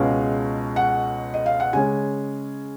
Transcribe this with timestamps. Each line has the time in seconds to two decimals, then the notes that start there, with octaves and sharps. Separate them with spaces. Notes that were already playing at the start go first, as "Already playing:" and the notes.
Already playing: C#2 B2 G#3 C#4 F5
0.76 F#5
1.34 D#5
1.46 F5
1.60 F#5
1.73 C#3 G#3 C#4 G#5